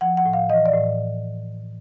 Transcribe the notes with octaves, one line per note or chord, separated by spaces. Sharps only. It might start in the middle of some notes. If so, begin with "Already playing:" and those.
F3 F#5
F#5
A2
F5
E3 D#5
D5
A2